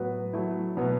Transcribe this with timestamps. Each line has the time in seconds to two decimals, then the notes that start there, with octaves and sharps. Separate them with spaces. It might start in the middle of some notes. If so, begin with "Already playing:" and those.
Already playing: A2 F#3 B3 F#4 B4
0.33 F#3 A3 E4
0.77 B2 F#3 B3